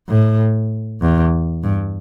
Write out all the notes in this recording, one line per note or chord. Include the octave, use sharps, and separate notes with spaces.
A2
E2
G2